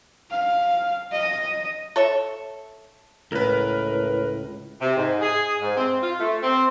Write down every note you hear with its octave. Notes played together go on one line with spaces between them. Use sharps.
F5
D#5
A4 C#5 E5
C#2 A2 A#4 B4
C3
G#2
G#4
G#2
C4
F4
A3
C4